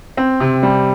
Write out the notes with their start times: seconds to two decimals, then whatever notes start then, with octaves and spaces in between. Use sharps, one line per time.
0.17 C4
0.40 C3
0.63 G3